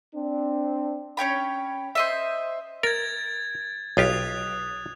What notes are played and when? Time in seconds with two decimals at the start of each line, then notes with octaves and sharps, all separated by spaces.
0.15 C4 D4
1.17 C#4 C#5 G5 B5
1.95 C5 D#5 E5
2.83 A#4 G#6 A6
3.97 B1 F4 G4 D#6 F#6 F7